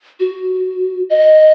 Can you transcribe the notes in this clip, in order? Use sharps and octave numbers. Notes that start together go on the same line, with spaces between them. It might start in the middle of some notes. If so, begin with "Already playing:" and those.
F#4
D#5